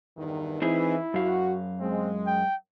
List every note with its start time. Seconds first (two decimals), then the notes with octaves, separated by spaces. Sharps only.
0.18 E2 G2 D#3
0.62 E3 C4 D#4 E4 G#4
1.14 F#2 F#4 F5
1.80 G#3 C4
2.27 G5